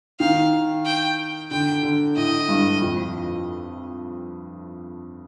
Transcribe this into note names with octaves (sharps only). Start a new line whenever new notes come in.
D#3 F5
G5
D3 G5
D3
A2 D#5
G2
F2